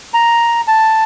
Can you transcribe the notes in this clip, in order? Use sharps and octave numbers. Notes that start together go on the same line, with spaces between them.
A#5
A5